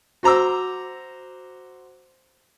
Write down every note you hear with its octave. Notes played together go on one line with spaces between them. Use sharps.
F#4 C5 A#5 D6 E6